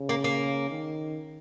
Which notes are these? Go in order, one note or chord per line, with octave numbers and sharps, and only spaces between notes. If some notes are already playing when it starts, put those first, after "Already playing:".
Already playing: C#3
A#3
A#3
D#3